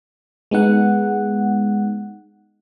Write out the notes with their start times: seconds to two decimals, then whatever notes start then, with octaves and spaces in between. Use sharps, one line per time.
0.51 G#3 B3 D#4 F#5